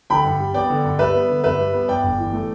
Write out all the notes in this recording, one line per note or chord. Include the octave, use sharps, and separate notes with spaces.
D3 G5 B5
G2
G3
B3 D5 G5
D3
G2
G3 B4 E5
B3
D3
G2 B4 E5
G3
B3
G2 D5 G5
G1
E3
A3